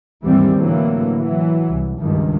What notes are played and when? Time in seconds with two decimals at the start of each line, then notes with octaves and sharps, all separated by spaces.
0.24 D#2 G#2 E3 G3 C4
0.57 A2 D3 E3 F#3 A#3
1.18 E3 F#3
1.68 C2
1.98 C#2 G2 D#3